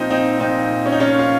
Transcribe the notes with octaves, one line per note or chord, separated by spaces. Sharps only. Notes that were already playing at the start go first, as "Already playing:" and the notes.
Already playing: A#2 F3 C4 D#4
C4 D#4
A#2 F3 C4 D#4
C#4
D#4
A#2 F3 C#4 F4
F4